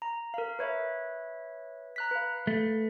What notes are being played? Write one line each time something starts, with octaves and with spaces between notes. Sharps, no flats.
A#5
A#4 F5
B4 C#5 E5
A#5 F#6 B6
B4 F5
A3